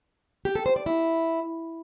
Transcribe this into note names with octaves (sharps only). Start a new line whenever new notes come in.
G4
A4
C5
D5
E4